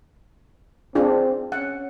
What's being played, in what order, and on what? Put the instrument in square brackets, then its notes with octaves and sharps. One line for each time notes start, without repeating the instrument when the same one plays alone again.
[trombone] C4 [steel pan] D4 F4 G#4
[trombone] C#4 [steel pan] F#5